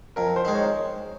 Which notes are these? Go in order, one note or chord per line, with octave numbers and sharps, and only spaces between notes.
F2 A#4
C5
D#3 G#3
C#5